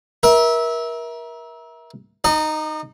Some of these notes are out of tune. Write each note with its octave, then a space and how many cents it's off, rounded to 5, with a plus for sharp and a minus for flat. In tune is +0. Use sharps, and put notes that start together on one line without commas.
A#4 +30 E5 -20
D#4 -10 D#5 -40